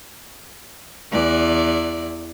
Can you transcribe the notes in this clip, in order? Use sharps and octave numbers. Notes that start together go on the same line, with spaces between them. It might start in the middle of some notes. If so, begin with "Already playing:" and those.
E2 E3 D5